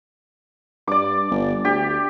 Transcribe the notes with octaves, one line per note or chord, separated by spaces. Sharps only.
G2 D5 D6
G1
D2 G4